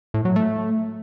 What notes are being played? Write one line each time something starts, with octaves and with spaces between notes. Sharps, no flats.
A2
F#3
A3